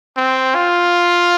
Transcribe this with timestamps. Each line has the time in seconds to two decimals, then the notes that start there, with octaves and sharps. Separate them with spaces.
0.17 C4
0.55 F4